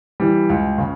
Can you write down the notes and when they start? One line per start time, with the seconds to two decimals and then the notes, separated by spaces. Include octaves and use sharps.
0.20 E3 G3
0.49 C#2
0.78 C#3